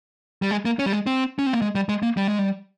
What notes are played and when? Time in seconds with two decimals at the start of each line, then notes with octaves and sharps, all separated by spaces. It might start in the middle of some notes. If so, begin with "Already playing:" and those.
0.42 G3
0.51 G#3
0.65 A#3
0.79 C#4
0.86 G3
0.93 G#3
1.06 C4
1.39 C#4
1.46 C4
1.53 A#3
1.62 G#3
1.75 G3
1.89 G#3
2.03 A#3
2.17 G3
2.28 G#3
2.39 G3